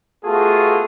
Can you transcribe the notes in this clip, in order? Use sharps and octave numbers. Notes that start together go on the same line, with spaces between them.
A3 B3 F4 F#4 G#4 A4